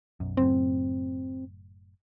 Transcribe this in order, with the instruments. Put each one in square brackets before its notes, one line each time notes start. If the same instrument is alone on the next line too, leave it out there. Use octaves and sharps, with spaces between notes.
[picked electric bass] B1 F#2
[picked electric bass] F#1 F#2 A2 [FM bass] C4